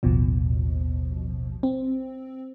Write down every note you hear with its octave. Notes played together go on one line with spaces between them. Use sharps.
A1 D#2 B2 F3
C4